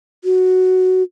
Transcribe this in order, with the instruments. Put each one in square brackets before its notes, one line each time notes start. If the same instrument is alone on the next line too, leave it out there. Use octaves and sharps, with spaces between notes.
[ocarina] F#4